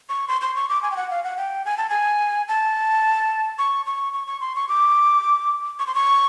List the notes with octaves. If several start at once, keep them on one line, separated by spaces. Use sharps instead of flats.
C#6
C6
C6
C#6
D6
G#5
G5
F#5
F5
F#5
G5
G#5
A5
G#5
A5
C#6
C#6
C#6
C#6
C6
C#6
D6
C#6
C6
C#6